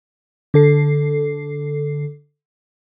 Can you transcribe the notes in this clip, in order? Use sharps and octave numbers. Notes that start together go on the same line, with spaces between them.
D3 A4 C7